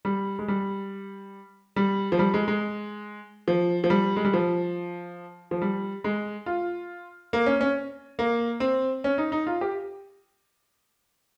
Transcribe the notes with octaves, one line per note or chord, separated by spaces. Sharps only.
G3
G#3
G3
G3
F3
G3
G#3
G#3
F3
F3
G3
G#3
G3
F3
F3
G3
G#3
F4
A#3
C#4
C#4
A#3
C4
C#4
D#4
D#4
F4
G4